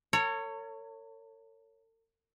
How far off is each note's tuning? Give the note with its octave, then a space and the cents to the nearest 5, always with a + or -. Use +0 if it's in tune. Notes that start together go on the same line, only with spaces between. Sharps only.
A4 +45 C#5 +0